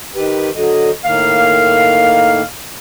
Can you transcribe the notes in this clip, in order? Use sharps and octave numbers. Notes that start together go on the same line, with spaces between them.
D#3 G4 B4
D3 F#3 D#5
A2 D#3 A#3 F5